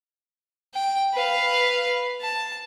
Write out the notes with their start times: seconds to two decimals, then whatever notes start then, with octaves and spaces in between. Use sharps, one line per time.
0.74 G5
1.14 B4 F5
2.21 A5